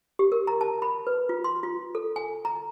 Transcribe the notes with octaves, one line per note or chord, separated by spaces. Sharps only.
G4
A#4
A#5
A5
B5
B4
F4
C6
F4
A4
G#5
A#5